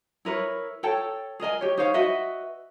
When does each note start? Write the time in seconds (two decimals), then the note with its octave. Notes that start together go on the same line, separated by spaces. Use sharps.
0.25 E4 A#4 B4 C#5
0.83 A4 C#5 G5 A5
1.40 G#4 A#4 D#5 G#5
1.61 G4 C#5
1.78 D#4 C5 C#5 F5
1.94 F#4 B4 D#5 E5